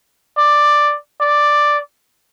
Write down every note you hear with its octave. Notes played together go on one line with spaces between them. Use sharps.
D5
D5